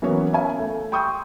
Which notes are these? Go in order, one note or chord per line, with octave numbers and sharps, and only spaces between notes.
E3 F#3 A#3 B3 C#4 C#5
C#5 E5 F5 G#5
A3
G5 C6 C#6 D#6 E6 G6